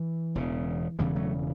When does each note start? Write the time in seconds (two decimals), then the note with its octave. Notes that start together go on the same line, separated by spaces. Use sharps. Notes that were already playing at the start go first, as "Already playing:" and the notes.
Already playing: E3
0.35 E1 E2 C#3
0.99 E1 E2 C#3 E3 G3
1.15 F#3 A3